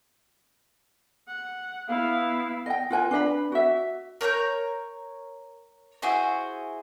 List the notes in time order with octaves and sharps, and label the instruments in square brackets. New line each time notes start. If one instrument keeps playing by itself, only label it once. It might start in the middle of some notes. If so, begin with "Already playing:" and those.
[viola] F#5
[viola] B3 E4 [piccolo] F5
[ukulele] D#5 G5
F4 B4 G5 G#5
D4 B4 D#5 B5
F#4 E5
[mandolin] A#4 C#5 A#5 G6
E4 F#4 G#4 C5